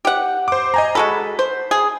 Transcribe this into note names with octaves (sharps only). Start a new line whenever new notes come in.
G4 F#5
C5 D6
D#5 G#5 A#5
G#3 F#4 A4 B5
C5
G#4